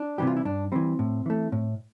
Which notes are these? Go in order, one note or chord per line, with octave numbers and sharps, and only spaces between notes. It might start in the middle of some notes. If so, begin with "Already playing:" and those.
Already playing: D4
C3 E3 G3 G4
F4
E4
G2 D4
E3 G3 C4
A2
E3 A3
A2